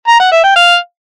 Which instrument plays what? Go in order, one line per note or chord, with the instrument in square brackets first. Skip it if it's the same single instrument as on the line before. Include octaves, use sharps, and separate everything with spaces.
[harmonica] A#5
F#5
E5
G5
F5